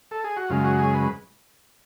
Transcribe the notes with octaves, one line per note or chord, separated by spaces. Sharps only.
A4
G#4
F#4
F#2 C#3 G#3 F4
F#4
G#4
B4